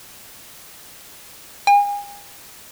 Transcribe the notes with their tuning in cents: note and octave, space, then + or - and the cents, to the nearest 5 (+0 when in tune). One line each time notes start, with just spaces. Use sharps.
G#5 -35